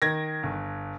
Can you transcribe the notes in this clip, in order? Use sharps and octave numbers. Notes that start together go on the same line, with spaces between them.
D#3 G#6 A#6
G1